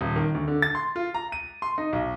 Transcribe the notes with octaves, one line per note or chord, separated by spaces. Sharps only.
D#1
D#3
D2
D3
A6
C6
F4
A#5
D#7
C6
D#4
B1